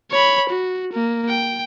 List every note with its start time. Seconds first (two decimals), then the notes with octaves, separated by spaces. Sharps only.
0.12 C#5 B5
0.50 F#4
0.93 A#3
1.29 G5